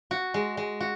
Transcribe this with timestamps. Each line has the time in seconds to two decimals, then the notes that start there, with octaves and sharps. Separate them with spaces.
0.11 F#4
0.34 G#3
0.57 G#3
0.80 F#4